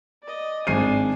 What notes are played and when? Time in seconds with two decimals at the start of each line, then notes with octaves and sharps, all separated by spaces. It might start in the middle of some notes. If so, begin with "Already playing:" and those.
0.23 D5 D#5
0.67 G#1 D4 G#5 C7 D#7